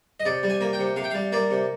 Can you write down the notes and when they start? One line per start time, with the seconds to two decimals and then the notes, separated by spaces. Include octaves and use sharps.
0.20 D#5
0.25 C3 D5
0.43 G3
0.50 G#5
0.61 A#3
0.73 G5
0.79 C3
0.96 C3 F5
1.04 G5
1.11 G3 F5
1.32 A#3 D5
1.51 C3